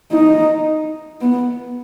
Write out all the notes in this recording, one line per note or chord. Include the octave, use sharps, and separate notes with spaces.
D#4
B3